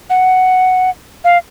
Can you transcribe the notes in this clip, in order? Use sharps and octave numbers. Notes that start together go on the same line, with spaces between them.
F#5
F5